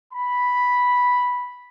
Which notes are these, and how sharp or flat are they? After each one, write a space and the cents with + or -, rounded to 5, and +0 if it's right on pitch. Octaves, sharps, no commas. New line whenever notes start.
B5 -5